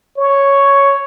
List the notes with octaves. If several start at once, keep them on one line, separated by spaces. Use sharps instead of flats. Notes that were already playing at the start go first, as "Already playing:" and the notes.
C#5